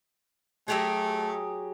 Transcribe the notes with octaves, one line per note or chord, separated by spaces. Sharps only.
F#3 A3 G4 G#4